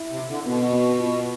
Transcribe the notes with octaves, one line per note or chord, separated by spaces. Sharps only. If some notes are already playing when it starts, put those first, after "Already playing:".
Already playing: E4
C3
E4
D3
B2 B3
B3
F4